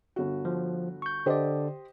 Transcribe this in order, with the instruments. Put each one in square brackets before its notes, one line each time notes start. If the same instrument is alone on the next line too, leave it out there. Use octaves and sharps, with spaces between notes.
[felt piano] G1 F#4
[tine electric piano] F3
C#6 G6
[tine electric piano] D3 D5 [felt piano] G4 C5 D#5